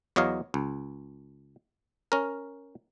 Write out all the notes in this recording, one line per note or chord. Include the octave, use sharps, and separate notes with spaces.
E2 F#3 C#5 D#5 F5
C#2
C#4 A#4